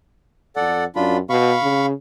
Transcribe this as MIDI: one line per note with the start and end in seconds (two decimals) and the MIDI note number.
0.56 0.87 41
0.56 0.84 69
0.56 0.84 74
0.56 0.84 78
0.96 1.20 42
0.96 1.17 62
0.96 1.17 65
0.96 1.17 83
1.29 1.55 47
1.29 1.86 77
1.29 1.86 83
1.29 1.86 85
1.62 1.93 49